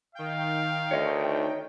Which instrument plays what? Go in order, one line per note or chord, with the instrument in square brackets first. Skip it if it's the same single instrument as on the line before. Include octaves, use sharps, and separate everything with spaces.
[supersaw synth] D#3 G5 [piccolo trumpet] F5
[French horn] D2 [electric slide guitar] C#5 D#5